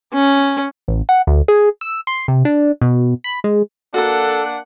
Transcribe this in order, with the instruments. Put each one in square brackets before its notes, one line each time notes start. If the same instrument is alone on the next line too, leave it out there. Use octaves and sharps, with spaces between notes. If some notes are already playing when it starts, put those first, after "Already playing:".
[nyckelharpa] C#4
[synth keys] A1
F#5
D2
G#4
E6
C6
C3
D4
B2
B5
G#3
[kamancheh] A#3 F#5 [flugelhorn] D4 [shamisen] F#4 A#4 [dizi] A4